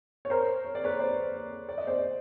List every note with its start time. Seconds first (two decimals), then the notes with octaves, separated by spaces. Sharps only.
0.25 C#5
0.30 A#4 C5
0.64 C#5
0.75 D5
0.84 B4 C#5
1.00 C5 D5
1.69 D5
1.78 D#5
1.87 C5 D5